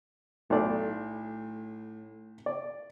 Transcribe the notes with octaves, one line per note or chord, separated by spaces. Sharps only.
B1 A2 A3 D5
D5